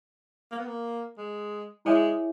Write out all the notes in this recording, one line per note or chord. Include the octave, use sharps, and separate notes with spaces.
A#3
B3
A#3
G#3
G#3 E4 G#4 C#5 E5 G#5